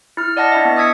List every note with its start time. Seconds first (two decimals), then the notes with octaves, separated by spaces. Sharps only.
0.17 E4 F6
0.37 D5 D#5 F#5 A5 A#6
0.52 D4 E4 E5
0.65 B3
0.77 D#5 D#6 E6 G#6 B6 C#7